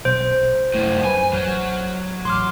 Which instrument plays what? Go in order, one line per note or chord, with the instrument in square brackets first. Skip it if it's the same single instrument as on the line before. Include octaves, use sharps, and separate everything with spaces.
[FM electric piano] B1 [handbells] C5
[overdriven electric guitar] C2 A2 [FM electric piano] F#2
[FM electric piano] F#2 B4 [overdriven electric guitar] G#5
[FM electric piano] A1 F6 G6 [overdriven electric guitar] F#3
[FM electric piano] A1 [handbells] C6 D6 F6